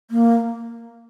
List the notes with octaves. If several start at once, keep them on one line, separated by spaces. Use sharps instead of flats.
A#3